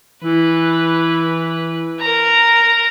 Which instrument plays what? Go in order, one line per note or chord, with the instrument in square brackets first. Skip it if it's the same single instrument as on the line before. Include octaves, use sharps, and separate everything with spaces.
[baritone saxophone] E3 [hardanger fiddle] B4
[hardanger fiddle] A#4 A#5